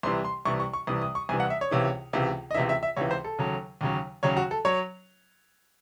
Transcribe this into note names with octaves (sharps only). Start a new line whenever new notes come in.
C2 C3 E3 C6
C6
C2 C3 E3 C#6
C#6
C#6
C2 C3 E3 D#6
D#6
C#6
C2 C3 E3 G#5
F#5
E5
C#5
C#2 C3 E3
C#2 C3 E3
D#5
C#2 C3 E3 E5
E5
E5
C#2 C3 E3 C#5
C5
A4
D#2 C#3 F#3
D#2 C#3 F#3
D#2 C#3 F#3 C#5
F#4
A4
F#3 C#5